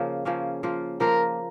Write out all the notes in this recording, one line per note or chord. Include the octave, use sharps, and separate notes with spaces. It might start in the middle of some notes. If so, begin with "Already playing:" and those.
Already playing: C#3 F3 A#3
C#3 F3 A#3 C#4
F3 A#3 F4
F3 A#3 F4 A#4